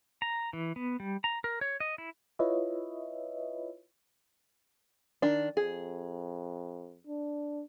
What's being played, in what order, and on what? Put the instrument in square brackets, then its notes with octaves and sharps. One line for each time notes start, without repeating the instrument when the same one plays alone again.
[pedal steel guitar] A#5
E3
B3
G3
A#5
A#4
C#5
D#5
E4
[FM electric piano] E4 F4 B4 C#5 D#5 E5
[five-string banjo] D#3 D4
[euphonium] F2 [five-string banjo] G#4
[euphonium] D4